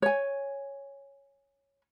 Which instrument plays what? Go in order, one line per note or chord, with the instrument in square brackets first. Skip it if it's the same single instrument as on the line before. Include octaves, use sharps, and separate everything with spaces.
[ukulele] C#5 G#5